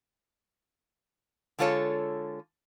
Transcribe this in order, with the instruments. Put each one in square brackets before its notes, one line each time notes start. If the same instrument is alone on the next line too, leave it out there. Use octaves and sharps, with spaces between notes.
[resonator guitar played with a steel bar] D3 G#3 F4 A4 C#5